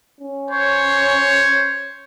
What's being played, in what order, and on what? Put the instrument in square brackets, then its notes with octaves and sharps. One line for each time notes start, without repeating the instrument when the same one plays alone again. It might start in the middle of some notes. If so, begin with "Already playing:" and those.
[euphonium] C#4
[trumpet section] C5 C#5